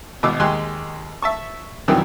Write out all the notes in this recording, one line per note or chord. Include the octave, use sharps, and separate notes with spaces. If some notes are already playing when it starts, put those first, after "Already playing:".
G#1 B2 D6 E6
D#2 G#3 G4 G#5 C6 F#6
E5 A5 C#6
F#2 C3 D#3 E3 F#3 G3